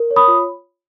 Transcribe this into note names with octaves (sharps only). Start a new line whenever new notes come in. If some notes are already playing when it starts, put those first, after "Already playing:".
Already playing: A#4
C#5
B5 D#6
F4